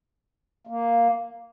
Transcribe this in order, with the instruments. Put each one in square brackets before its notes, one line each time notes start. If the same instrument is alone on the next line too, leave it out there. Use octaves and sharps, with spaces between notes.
[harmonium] A#3